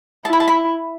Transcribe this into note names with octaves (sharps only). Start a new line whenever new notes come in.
E4 A5
B5
A5
B5